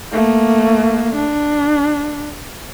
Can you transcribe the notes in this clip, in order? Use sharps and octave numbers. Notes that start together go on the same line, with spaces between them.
A3 A#3
D4